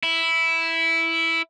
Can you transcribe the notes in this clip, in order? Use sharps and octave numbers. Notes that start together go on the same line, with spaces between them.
E4